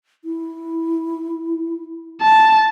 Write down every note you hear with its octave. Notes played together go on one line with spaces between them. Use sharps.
E4
A5